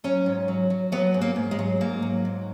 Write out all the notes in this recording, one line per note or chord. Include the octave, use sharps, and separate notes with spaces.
F#3 C#4
G#2
F#3
F#3
F#3 B3
G#2
A#3
G#2
G#3
F#3
G#2 A#3
F#3
G#2